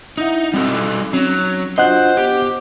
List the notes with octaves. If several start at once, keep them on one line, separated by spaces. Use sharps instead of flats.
D#4 E4 E5 F#5
G3 C4 D#4 F#4 A4
F#3 C4 C#4
D4 F4 F#4 C5 D#5 F#5 F#6
B3 G4 C5